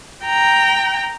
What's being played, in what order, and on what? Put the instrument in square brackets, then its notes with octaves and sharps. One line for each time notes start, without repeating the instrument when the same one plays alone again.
[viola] G5 A#5